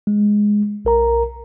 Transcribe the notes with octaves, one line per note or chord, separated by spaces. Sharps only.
G#3
B1 A#4 A#5